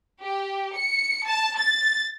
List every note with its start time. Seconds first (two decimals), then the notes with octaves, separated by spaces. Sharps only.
0.22 G4
0.76 C#7
1.27 A5
1.58 A6